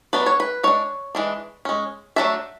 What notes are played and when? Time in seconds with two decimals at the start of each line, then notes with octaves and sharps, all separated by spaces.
0.13 F#3 B3 D4 B4
0.26 C#5
0.40 B4
0.63 G#3 D4 C#5
1.15 E3 G#3 D4
1.65 G#3 C#4
2.16 F#3 A3 D4 E5